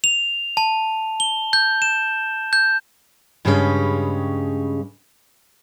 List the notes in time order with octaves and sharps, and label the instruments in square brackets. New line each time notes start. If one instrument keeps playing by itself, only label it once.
[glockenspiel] F7
A5
G7
G6
E7
G6
[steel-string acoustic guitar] G2 C#3 G3 G#3 B3 C#4